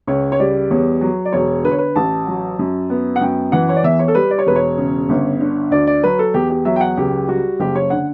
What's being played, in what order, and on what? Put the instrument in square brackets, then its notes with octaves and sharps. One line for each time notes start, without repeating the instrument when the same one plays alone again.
[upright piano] C#2 C#5
C#5
G3 D5
E2 C#5
F#3
D5
E1 C#5
D3 B4
C#5
B4
A1 A5
F#3
F#2
B3
F#5
F#2 G5
E3 F#5
C#5
D5
E2 E5
C#5
A4
G3 B4
D5
C#5
E1 B4
C#5
C#3
G1
D3
D2 D5
D5
F#3 B4
A4
E2 G4
G4
F#3 E5
G5
F#5
C#2 G4
G3 F#4
F#1 G4
C#5
D3 F#5